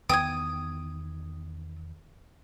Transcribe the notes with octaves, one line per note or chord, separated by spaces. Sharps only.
E2 D#3 B3 G5 D#6 G#6